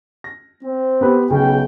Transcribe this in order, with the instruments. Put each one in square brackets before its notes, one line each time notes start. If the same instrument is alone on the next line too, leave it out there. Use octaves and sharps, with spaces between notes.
[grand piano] A#6
[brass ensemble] C4
[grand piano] B3 G4 B4
[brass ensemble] B1 G5 [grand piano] C#3